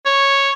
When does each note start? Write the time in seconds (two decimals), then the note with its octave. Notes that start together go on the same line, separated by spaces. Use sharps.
0.06 C#5